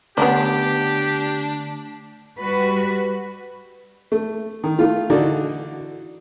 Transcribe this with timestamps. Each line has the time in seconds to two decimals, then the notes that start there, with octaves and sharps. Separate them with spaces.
0.18 D3 A3 B3 C#4 D4 G4 D5
2.38 G3 F#4 B4
4.12 A3
4.64 D#3
4.79 A3 F4
5.10 D3 E3 D4 D#4 F#4